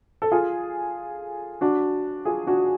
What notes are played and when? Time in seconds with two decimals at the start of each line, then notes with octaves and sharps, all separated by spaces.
0.22 A4
0.32 F4 G#4
1.61 D4 F#4
2.25 F4 G#4
2.47 D4 F#4